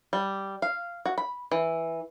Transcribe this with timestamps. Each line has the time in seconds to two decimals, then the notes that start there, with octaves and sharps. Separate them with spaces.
0.13 G3
0.62 F5
1.06 F#4
1.18 B5
1.51 E3